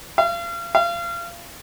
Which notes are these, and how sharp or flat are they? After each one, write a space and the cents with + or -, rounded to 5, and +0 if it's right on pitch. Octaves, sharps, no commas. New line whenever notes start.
F5 -35
F5 -30